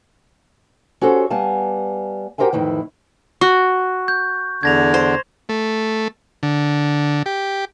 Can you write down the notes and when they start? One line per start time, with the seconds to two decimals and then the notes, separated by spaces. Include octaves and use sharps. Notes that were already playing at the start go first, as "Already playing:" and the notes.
1.01 C#4 F#4 G4 A4 C5
1.30 G3 B3 F5 G#5 A5
2.38 F#4 G4 A#4 C5 E5 G#5
2.53 F2 A2 D#3 E3 E4
3.41 F#4 C#6 F#6
4.08 G6
4.63 E2 D3 D4 G#6 A#6 F7
4.94 C5
5.49 A3
6.43 D3
7.26 G4